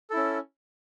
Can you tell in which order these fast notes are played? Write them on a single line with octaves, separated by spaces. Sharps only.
A4 E4 C#4